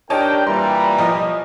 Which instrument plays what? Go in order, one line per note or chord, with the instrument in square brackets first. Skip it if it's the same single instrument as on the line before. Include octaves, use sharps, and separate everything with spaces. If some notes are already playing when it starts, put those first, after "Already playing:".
[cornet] D4 [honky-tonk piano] D#4 C#5 A5 [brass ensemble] G4 A#4 G5
[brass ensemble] A#2 E3 G3 [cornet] A#5 [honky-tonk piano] C6
[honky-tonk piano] B1 F3 D#5